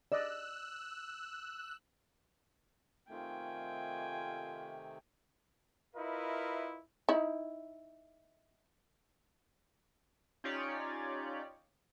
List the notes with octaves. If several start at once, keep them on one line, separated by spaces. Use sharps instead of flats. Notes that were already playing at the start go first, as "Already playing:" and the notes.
D5 D#5 E6 F#6
C3 D#3 A3 F4 G5 G#5
E4 F4 A#4 B4 D#5 E5
D#4 E4
C#4 D#4 F4 G4 C#5 D5